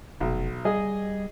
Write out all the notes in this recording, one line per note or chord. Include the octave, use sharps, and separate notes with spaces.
F1 B1
G3 G#4 D#5